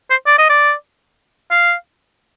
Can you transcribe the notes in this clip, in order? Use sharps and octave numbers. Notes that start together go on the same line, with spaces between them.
C5
D5
D#5
D5
F5